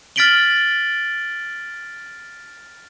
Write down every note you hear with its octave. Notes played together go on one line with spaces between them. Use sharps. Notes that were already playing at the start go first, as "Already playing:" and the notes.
F6 A6 B6 D7 F#7 G7